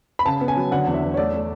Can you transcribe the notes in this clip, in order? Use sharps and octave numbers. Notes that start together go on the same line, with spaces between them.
B5
C#3 A5
B3
G#5
F#3
D3 F#5
E2
E5
E2
C#5
A3 D5
A3